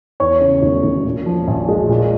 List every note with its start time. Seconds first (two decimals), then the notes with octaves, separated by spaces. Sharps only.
0.20 E2 C#5 C#6
0.41 C#3
0.62 E1
0.83 E1
1.05 A#2
1.26 F3
1.48 A#1
1.68 G#3
1.89 A#2